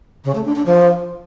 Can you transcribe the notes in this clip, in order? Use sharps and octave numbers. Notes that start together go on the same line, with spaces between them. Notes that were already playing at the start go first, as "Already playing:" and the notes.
C#3
A3
D4
D4
F3